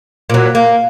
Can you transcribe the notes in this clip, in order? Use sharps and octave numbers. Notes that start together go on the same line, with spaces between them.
A#2 F#3
A#3